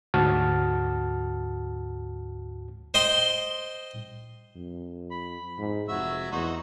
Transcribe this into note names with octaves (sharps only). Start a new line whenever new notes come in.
D2 G#2 F#4 A5 F6
C5 D#5 G5 C6
F2
B5
G#2
F1 F#3 F#4 E5
E2 D#4 F#4 C5